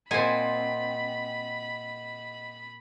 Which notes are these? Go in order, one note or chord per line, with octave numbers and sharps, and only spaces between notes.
A#2 C4 D#5 F#5 G#5 B5